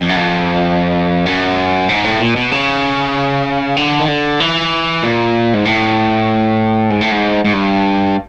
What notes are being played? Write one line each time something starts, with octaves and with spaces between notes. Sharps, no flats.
F2
F#2
F2
F#2
G#2
A2
A#2
B2
C#3
D3
D#3
D3
E3
A#2
G#2
A2
G#2
A2
G#2
G#2
G2